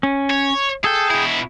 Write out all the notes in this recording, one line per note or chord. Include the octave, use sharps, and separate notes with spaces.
C#4
C#5
G#4 A4 G5
B2 E4